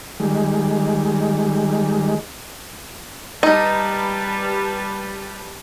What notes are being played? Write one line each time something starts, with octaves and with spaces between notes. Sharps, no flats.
D#3 G3 G#3
G3 D#4 B4 A5